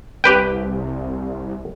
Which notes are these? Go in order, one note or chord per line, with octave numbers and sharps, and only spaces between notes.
C2 G4 B4 G5